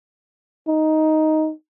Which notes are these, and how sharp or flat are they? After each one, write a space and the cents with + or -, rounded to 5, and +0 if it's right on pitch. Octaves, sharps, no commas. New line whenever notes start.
D#4 +5